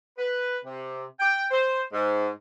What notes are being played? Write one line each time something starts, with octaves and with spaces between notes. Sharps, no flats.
B4
C3
G5
C5
G#2